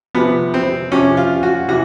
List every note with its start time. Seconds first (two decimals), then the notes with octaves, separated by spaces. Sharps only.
0.15 C3 F3 B3
0.54 C4
0.92 C3 F3 C#4
1.17 F4
1.43 F#4
1.68 C3 E3 F#4